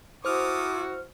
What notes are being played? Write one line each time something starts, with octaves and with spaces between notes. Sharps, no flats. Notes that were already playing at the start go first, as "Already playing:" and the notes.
E4 F#4 A4 C5 D6 D#6 F6